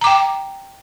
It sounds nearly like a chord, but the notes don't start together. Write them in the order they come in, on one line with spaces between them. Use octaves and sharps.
A#5 D6 G5